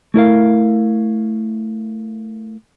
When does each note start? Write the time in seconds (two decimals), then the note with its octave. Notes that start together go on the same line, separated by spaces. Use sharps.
0.14 A3 E4 A#4 F5